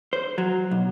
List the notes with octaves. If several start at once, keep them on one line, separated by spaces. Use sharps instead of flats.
C5
F#3
B1